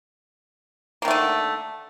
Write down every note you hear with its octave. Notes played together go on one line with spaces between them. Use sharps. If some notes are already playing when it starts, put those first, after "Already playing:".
D3 D#3 A3 A#3